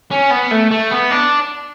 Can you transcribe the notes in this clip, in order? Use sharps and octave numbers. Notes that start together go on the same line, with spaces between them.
C#4
B3
A3
A3
B3
D4